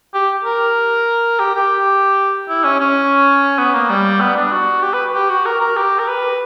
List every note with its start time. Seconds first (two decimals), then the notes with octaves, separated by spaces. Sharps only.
0.15 G4
0.45 A#4
1.39 G4
1.56 G4
2.49 E4
2.64 C#4
2.80 C#4
3.59 B3
3.74 A#3
3.90 G3
4.20 B3
4.36 D4
4.52 F#4
4.83 G4
4.94 B4
5.15 G4
5.30 F#4
5.46 A#4
5.61 A#4
5.77 G4
5.99 A#4
6.08 B4